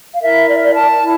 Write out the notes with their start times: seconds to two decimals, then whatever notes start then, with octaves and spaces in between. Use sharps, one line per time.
0.14 F5
0.22 E4 A#4 E5
0.48 D5
0.63 D5
0.75 A5
1.02 E4